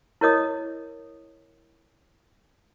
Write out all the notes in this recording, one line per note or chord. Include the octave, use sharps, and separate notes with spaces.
E4 A#4 C#5 D#5 D#6